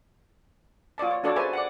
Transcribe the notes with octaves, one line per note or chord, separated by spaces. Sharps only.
F4 C#5 D5 A5
C#5
D4 F#4 A4 C#5 D5
G#4 B4 C5 E5 G#5 A5
D5 F#5